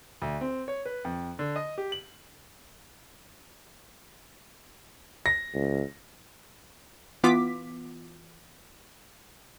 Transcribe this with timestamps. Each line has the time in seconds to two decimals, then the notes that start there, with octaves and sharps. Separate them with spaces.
0.22 D2
0.41 C4
0.68 C#5
0.86 B4
1.05 F2
1.39 D3
1.56 D#5
1.78 G4
1.92 F#7
5.26 A#6
5.54 C#2
7.24 E3 B3 F4 D6 B6